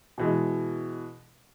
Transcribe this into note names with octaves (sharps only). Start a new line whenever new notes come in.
B2 E3 G#3